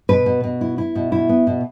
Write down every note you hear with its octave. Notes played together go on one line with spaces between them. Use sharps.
B2 B4
B2
B2
E4
E4
B2
E4
B3
B2